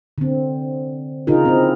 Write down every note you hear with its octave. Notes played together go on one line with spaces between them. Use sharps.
D3 C4
C#3 D#4 F4 G#4 A#4
C4 E4